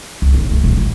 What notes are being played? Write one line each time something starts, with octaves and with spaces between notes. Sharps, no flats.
C#2
A#1 D#2
C#3 A3
D#1 A#2
A1